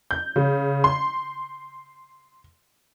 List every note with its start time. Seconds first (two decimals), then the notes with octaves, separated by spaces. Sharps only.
0.11 G6
0.36 C#3
0.84 C6